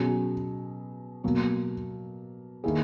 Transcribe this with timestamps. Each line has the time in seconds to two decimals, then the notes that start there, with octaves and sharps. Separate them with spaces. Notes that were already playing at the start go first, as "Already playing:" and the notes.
Already playing: B2 F#3 C#4 G#4
1.24 B2 F#3 A#3
2.64 D#3 A#3 E4 G#4